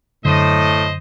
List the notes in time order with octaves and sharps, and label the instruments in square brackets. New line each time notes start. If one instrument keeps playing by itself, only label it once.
[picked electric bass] F#2 D3 [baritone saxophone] A2 [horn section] C5 D#5